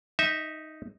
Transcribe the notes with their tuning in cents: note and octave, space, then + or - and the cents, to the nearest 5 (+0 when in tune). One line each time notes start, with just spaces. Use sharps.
D#4 +0 E5 -15